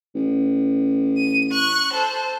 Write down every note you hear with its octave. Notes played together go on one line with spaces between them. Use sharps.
A1
D#7
C#6 F#6
A4 C5